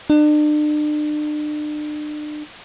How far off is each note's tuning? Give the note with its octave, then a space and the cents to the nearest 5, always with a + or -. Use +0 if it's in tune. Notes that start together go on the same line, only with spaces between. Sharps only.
D4 +40